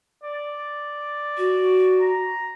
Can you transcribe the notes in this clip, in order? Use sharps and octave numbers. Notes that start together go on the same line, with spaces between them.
D5
F#4
A#5